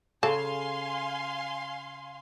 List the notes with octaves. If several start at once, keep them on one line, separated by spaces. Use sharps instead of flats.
C#3 A4 F5 G#5 C6